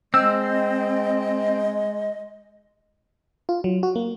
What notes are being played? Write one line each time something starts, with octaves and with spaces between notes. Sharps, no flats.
G#3 C4 D#5 E6
F4
F#3
F#4
A#3